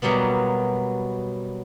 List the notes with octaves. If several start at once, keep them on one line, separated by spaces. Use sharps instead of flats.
B2 F#3 G3 A#3 B3